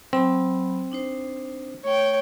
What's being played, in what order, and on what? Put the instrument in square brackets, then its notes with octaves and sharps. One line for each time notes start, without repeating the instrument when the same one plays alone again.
[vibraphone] F#3 B5 [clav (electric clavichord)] C4
[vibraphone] D4 D#4 C5
[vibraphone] A3 [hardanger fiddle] C#5 G5